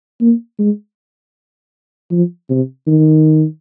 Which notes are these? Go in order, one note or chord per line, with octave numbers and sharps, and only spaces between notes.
A#3
G#3
F3
C3
D#3